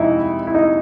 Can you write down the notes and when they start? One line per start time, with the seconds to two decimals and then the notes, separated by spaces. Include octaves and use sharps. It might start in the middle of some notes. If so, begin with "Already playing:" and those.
Already playing: F2 C3 G#3 D#4 E4
0.47 E4
0.54 D#4